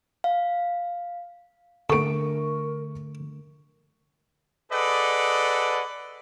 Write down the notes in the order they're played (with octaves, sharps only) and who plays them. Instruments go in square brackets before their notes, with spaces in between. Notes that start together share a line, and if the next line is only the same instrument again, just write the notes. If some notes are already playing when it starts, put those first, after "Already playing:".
[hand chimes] F5
[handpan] D3 A3 [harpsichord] B3 A4 [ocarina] A#4 [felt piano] C#6 D7
[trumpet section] G#4 A4 B4 D5 D#5 F#5